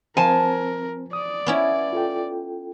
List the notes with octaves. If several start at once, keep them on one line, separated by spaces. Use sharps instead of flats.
F3 C4 A#4 C5 G#5 A5
D5 D#6
B3 C#4 E4
F4 A4 G5